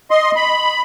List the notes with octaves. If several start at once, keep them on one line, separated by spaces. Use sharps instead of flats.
D#5 C6
B5